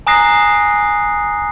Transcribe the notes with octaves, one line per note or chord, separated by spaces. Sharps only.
G#5 A#5 D#6 F#6 A#6 C7